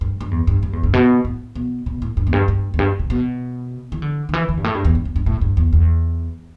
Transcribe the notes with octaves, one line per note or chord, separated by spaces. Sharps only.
G2
G2
E2
G2
G2
E2
G2
B2
A2
B2
B2
A2
G2
E2
G2
G2
E2
G2
B2
B2
E3
D3
D3
E3
E3
G2
A2
G2
E2
G2
E2
G2
A2
G2
E2
E2